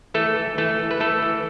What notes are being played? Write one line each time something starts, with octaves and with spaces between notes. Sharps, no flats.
E3 A3 A4
E3
E3 A3 A4
E3
B4
E3 A3 A4
E3